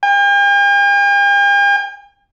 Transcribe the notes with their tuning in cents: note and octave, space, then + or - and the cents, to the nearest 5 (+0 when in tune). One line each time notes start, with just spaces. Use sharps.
G5 +45